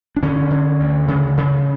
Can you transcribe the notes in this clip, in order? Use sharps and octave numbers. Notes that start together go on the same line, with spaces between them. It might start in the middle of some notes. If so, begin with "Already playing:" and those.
D4
D3 C#4
D3
D2
C#3
C#3